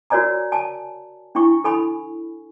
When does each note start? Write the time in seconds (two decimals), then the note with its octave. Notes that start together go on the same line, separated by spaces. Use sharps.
0.10 F#4 A#4 C#5 D5 G#5 A#5
0.52 G#5 A5
1.35 D4 E4 G5 C#6
1.64 A4 G#5 B5